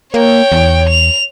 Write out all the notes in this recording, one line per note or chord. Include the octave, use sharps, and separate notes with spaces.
A#3 C#5 G5
E2
F7